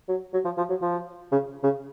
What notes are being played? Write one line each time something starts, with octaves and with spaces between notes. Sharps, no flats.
F#3
F#3
F3
F3
F#3
F3
C#3
C#3